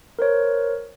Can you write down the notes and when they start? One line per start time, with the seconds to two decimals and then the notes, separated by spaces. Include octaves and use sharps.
0.19 A#4 C5 C#5